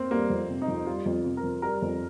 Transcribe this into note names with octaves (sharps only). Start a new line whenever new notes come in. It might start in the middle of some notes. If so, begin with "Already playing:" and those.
Already playing: A#3 C4
G3 A#3
F2
C3
D#4
F2
G3 F4
F2
C3
A#4
F2
G3 A#4
F2